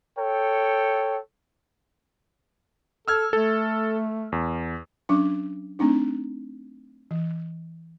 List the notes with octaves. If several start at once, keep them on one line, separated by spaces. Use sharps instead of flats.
A4 C#5 G5
A4 E6 F6 G#6
A3 A4
E2
F#3 C#4 D4 D6
A3 C4 D4 D#4
E3